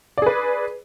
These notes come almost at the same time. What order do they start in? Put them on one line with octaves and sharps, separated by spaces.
D5 G#4 B4